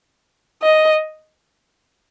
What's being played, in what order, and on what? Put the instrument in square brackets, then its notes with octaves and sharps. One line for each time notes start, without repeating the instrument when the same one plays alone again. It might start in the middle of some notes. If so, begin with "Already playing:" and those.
[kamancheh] D#5